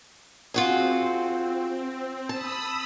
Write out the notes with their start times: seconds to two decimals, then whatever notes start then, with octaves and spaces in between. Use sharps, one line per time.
0.54 C4 F4 F#4 G#4
2.29 A5 B5 D#6 E6